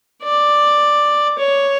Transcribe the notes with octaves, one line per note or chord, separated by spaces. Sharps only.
D5
C#5